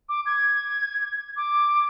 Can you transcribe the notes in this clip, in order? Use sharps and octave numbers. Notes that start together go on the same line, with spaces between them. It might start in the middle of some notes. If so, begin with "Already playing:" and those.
D6
G#6
D6